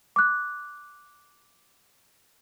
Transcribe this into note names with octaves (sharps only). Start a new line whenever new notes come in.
D6 F#6